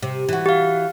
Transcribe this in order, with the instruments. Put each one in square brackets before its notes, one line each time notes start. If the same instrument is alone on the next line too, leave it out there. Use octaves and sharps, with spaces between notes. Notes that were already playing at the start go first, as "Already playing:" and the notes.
[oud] C3
E3 F#4
[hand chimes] G4 F5